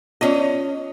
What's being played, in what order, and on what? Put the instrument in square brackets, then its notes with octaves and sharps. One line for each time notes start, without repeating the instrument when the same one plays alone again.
[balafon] B3 F4 D5 [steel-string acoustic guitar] C#4 D#5